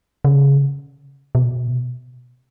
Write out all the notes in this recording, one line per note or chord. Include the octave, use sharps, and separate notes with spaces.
C#3
B2